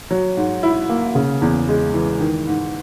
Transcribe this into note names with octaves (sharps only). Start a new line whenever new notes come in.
F#3
G#2
E4
A#3
C#3
E2
G#3
E3
D#3
G#2